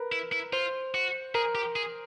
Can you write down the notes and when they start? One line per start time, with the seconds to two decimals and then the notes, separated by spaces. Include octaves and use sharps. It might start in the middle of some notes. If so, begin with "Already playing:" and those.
Already playing: A#4 B4
0.12 E4
0.32 E4
0.53 F4 C5
0.94 F#4
1.35 G#4 A#4
1.55 G4
1.76 G#4